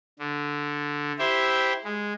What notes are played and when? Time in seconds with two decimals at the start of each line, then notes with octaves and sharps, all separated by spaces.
0.19 D3
1.19 E4 G4 C5 E5
1.84 G#3